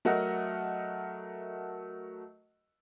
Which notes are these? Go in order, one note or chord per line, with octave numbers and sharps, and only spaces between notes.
F#3 A3 A#4 D#5 F#5